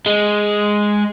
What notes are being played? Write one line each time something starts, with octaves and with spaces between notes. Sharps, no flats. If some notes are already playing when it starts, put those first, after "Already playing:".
G#3